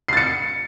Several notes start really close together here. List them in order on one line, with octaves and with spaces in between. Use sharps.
C7 A6 C#7